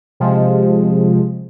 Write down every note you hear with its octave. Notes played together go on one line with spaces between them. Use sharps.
C3 F3 G#3